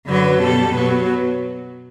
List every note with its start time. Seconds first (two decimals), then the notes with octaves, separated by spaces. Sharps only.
0.09 F#2 D3 F#3 B4
0.41 B2 G3 A4
0.74 B2 F#3 B4